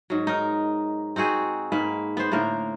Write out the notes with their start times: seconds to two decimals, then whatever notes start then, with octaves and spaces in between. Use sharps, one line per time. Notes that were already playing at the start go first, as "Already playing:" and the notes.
0.10 G#2 F#3
0.27 D#4 A#4
1.16 C4 D#4 F#4 G#4
1.72 G#2 A#3 B4
2.17 B3 C5
2.32 A2 D3 A#3 A#4